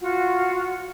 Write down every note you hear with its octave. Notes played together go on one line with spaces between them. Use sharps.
F4 F#4 F#5